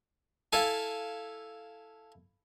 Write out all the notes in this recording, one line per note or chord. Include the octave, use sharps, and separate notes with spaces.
E4 A4 F5 G#5